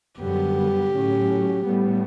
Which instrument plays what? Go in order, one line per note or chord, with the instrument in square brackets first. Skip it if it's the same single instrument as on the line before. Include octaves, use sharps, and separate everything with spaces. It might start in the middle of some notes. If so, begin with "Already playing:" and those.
[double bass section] F#2 D3 G3 B3 [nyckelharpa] G4
[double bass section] A2 F#3 C#4
A2 G3 B3